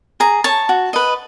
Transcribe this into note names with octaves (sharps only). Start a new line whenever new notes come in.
G#4 A#5
C#5 A5
F#4
B4 D#5